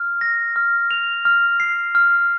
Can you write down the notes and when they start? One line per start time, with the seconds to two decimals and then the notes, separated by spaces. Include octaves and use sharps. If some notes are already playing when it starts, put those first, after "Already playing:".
Already playing: F6
0.21 A#6
0.56 F6
0.91 F7
1.25 F6
1.60 C7
1.95 F6